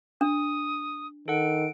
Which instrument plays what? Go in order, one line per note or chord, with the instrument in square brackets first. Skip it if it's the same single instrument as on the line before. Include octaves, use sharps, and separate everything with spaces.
[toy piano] D4 [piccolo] D#6
[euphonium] D#3 [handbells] A4 F#5 [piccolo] D7